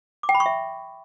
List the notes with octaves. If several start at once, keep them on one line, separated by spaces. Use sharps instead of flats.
D6
G5
B5
C#6
E5